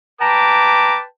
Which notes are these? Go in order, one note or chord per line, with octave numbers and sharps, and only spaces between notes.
B4 G5 A5 A#5 D6